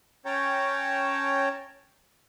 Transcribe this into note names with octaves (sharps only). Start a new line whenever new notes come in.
C#4 C#5 G5 A5 A#5